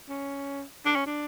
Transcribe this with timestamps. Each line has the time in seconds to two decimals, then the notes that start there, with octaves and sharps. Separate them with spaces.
0.09 C#4
0.85 D4
0.96 C#4
1.06 D4